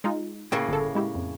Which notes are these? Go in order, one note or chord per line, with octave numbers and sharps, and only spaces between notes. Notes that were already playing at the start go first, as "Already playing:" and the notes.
G#3 D#4 F4
A2 C#3 A#3 G5 C#6
G1 A4
G#3 E4 G4
F2